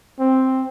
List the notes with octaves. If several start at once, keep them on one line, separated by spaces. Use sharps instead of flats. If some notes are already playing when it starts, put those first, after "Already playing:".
C4